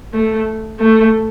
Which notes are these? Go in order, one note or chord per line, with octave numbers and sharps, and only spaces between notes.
A3
A3